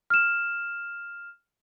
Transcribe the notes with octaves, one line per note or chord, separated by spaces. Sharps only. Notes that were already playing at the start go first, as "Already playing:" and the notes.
F6 E7